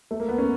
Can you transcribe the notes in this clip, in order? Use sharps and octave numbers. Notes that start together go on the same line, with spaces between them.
A3
A#3
B3
C#4